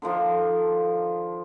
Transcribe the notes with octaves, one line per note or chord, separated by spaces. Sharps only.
D3 D#3 F3 D4